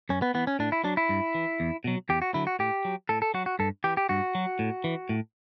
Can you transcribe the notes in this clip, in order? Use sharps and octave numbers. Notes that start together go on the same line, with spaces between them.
F#2 C#4
B3
E3 B3
C#4
A2 D4
E4
F#3 D4
E4
G2
E3
E2
B2 F#3
E2 G4
F#4
D3 F#3 E4
F#4
A2 G4
F#3
A2 A4
A4
F#3 F#4
F#4
G2 A4
E3 G4
G4
G2 F#4
F#3
A2
E3
A2